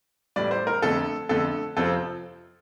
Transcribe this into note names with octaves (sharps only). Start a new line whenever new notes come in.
A2 E3 G3 D5
C5
A#4
F2 D3 A3 A4
F2 D3 A3 A4
F2 C3 F3 C4 F4 A4